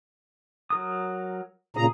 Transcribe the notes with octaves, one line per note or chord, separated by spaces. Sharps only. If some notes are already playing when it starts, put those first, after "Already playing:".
F#3 A#4 D#6
A#2 C#3 G#4 A#5